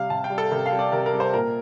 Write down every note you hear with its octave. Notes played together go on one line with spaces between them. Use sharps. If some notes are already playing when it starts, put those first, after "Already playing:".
Already playing: C3 G3 F5
C3 A5
G5
G3
A4
C3 A#4
F5
G3
D5
C3 A#4
A#4
G3
C5
A#2 A#4